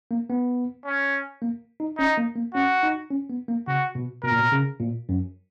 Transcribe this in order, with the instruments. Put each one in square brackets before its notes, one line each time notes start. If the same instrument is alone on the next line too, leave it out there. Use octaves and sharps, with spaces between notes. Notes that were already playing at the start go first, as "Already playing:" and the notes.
[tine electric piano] A#3
B3
[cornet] C#4
[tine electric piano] A#3
D#4
[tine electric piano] C#4 [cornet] D#4
[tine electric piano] A#3
A#3
[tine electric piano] C#4 [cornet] F#4
[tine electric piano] D#4
C#4
B3
A#3
[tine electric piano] C#3 [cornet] F#4
[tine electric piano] B2
[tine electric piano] B2 [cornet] A#4
[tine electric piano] A#2
B2
C#3
A#2
F#2